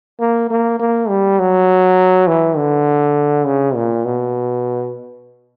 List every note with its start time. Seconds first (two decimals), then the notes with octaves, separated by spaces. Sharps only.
0.20 A#3
0.50 A#3
0.80 A#3
1.09 G3
1.39 F#3
2.28 E3
2.57 D3
3.46 C#3
3.75 A#2
4.05 B2